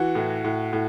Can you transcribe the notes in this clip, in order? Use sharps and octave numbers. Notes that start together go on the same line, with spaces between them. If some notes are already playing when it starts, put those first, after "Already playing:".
Already playing: E3 F#4
A2
A2
A2